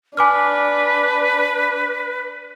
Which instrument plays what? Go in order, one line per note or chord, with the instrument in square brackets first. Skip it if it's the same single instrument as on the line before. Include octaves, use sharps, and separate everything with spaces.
[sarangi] D4 [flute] B4 [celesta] G#5 D6 F6